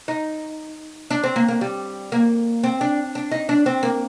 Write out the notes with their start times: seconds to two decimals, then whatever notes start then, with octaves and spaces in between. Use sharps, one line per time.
0.08 D#4
1.10 D4
1.24 C4
1.36 A#3
1.48 A#3
1.61 G3
2.12 A#3
2.63 C4
2.81 D4
3.15 D4
3.31 D#4
3.49 D4
3.66 C4
3.83 A#3